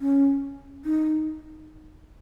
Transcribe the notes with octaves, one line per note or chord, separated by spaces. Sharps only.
C#4
D#4